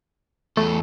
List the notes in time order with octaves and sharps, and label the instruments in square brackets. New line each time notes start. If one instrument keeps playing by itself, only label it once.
[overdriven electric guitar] E2 A4 [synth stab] A3